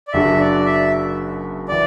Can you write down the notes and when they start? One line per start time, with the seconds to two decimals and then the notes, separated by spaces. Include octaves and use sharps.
0.08 D5
0.13 F#1 F#2 F#3 D4 F#4 E5
0.40 D5
0.65 E5
1.68 E3 D5